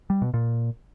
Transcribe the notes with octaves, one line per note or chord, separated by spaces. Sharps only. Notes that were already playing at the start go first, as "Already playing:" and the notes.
G3
B2
A#2